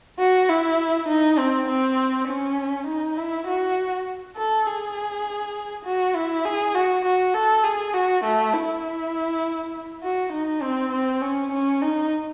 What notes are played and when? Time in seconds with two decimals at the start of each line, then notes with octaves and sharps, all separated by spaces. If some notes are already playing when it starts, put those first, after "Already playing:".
0.20 F#4
0.49 E4
1.09 D#4
1.38 C4
1.68 C4
2.28 C#4
2.87 D#4
3.17 E4
3.47 F#4
4.37 A4
4.67 G#4
5.85 F#4
6.15 E4
6.45 G#4
6.75 F#4
7.05 F#4
7.34 A4
7.64 G#4
7.94 F#4
8.24 A3
8.53 E4
10.03 F#4
10.33 D#4
10.62 C4
10.92 C4
11.22 C#4
11.52 C#4
11.82 D#4